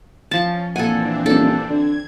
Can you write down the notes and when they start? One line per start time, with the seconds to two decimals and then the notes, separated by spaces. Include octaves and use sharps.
0.31 F3 C#4 A5
0.76 A#2 E3 C4 D4 A4 F#5 G#5
1.26 D#1 A4
1.69 D3 G#6